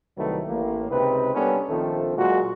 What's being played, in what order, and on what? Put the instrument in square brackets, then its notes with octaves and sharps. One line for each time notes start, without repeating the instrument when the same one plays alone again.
[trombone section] C2 D#3 F#3 G3 A3 B4
A1 A2 A#3
C#2 C3 C4 D#4 B4
G3 A#3 B3 C#4 D4 A4
A#1 D#3 F3 A3 C4 A4
A#2 F#3 G#3 F4 F#4